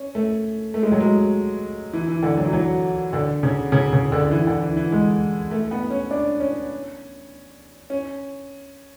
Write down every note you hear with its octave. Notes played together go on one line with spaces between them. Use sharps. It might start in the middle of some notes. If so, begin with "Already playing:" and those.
Already playing: C#4
A3
A3
G#3
F#3
G#3
E3
E3
D3
F#3
E3
F#3
D3
C#3
C#3
C#3
D3
E3
D3
E3
E3
G#3
A3
B3
C#4
D4
C#4
C#4